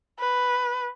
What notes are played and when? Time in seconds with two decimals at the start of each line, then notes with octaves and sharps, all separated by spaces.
0.19 B4